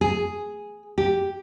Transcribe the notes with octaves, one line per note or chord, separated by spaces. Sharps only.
G#4
G4